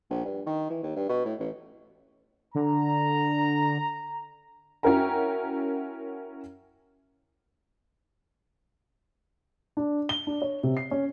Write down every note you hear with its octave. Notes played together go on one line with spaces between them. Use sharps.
A#1
G2
D#3
E3
D#2
G2
B2
A2
A1
D3 A#5
C#4 E4 F#4 A#4 G5 A#5
D4
G7
D4
C#5
C3
C7
C#4